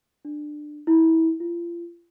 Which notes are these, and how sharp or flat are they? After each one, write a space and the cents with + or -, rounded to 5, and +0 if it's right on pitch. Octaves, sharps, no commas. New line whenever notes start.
D4 +20
E4 -25
F4 -35